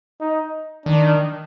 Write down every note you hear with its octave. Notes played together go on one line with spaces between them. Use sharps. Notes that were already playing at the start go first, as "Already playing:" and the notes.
D#4
D#3 D4